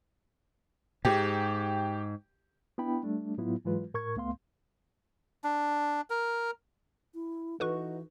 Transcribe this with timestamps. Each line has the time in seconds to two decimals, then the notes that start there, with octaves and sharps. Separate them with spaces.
1.05 G#2 G4
2.78 B3 D4 E4 G5 B5
3.03 G3 A3 D4
3.38 A2 F#3 B3 E4 F4
3.65 G#2 E3 F#3 G#3 F4 B4
3.94 A2 A#4 C#6 G#6
4.16 C#2 A3 B3 F5 C6
5.44 D4
6.10 A#4
7.13 E4
7.60 E3 D#4 F#4 A4 B4 C#6